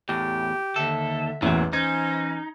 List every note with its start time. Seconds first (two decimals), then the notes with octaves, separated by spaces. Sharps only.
0.09 E2 A2 G4
0.76 D#2 D3 A4 E5
1.42 A1 E2 A#2 F#3 E4
1.73 E3 C#4 D#4 C5 G#6